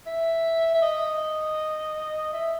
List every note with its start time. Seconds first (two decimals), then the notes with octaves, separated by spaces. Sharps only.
0.06 E5
0.74 E5
0.82 D#5
2.33 E5